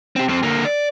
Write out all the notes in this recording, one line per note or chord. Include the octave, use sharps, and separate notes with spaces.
C4 G4
F2 C4
D3 A#3
D5